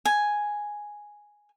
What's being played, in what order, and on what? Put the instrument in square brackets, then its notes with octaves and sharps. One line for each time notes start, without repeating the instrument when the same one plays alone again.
[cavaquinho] G#5